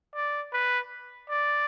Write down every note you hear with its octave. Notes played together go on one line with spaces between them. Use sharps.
D5
B4
D5